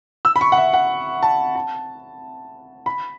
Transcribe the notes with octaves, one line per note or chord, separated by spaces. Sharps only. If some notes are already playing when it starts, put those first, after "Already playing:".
E6
B5
C#6
F#5
E5
F#5
A5
A5
B5